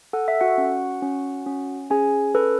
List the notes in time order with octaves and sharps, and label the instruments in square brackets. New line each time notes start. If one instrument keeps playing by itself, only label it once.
[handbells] A4 F#5
E5
F#4 F#5
C#4
C#4
C#4
C#4 G#4 G#5
A4 B4